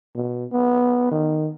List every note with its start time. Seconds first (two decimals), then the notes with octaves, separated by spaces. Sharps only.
0.15 B2
0.52 B3
1.11 D#3